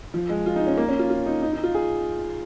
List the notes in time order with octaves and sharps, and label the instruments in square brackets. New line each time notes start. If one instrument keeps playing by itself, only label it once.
[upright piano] F3
G#3
F4
D#4
C#4
A#3
C#4
F4
F4
D#4
D#4
D#4
F4
G#4